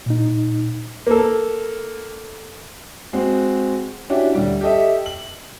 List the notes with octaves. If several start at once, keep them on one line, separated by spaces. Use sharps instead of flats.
A#2 D#4
A#3 A4
G#3 C4 F#4
C#4 D4 E4 F#4 G4
D2 G3
G4 A4 D#5 E5
F#7